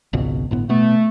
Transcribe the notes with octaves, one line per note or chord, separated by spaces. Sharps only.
G#1 C#2 B2
G1 A2 B3
B2 A3 B3